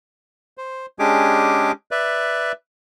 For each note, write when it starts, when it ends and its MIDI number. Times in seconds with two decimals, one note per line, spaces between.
0.58 0.86 72
0.99 1.72 56
0.99 1.72 61
0.99 1.72 62
0.99 1.72 67
0.99 1.72 68
0.99 1.72 86
1.91 2.52 71
1.91 2.52 74
1.91 2.52 76